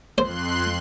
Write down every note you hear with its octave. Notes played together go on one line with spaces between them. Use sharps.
F2 C5 C6 F#6